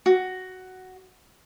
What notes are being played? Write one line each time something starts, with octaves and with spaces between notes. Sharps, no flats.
F#4